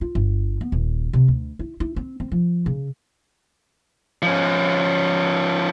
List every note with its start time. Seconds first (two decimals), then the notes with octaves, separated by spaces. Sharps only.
0.01 F4
0.15 G1
0.61 B3
0.72 D#1
1.13 C3
1.28 D2
1.59 E4
1.80 E4
1.96 C4
2.20 C4
2.32 F3
2.66 C#3
4.22 F3 C#4